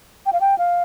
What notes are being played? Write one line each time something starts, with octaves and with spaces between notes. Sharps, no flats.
G5
F5
G5
F5